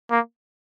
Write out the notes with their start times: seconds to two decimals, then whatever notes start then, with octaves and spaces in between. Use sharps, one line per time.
0.11 A#3